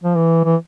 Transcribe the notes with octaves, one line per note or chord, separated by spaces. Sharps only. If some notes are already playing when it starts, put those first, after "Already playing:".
F3
E3
E3